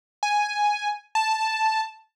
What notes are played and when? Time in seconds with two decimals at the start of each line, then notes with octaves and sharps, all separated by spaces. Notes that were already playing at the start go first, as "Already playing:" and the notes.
0.23 G#5
1.15 A5